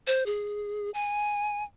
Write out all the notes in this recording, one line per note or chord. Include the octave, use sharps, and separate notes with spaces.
C5
G#4
G#5